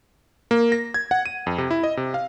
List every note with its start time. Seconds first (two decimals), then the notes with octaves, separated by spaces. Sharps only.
0.51 A#3
0.72 A#6
0.94 G#6
1.11 F#5
1.26 D#7
1.47 F2
1.58 C3
1.71 E4
1.84 D#5
1.97 C3
2.14 F5